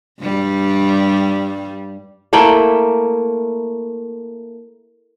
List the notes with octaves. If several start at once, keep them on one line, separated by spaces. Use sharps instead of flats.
G2 G3
A3 A#3 E4 G5